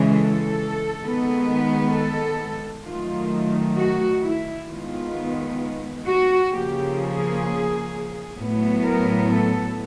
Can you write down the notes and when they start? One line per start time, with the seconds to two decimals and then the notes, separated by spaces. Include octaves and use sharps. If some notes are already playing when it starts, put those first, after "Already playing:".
Already playing: C#3 E3 G#3
0.09 A4
1.00 D#3 G#3 B3
1.92 A4
2.85 D#3 F#3 A3 F4
3.76 F#4
4.22 E4
4.69 D#3 G#3 B3 F4
6.07 F#4
6.52 C#3 F3 A#3 G4
6.99 G#4
8.37 A2 F#3 B3
8.83 A#4
9.29 A4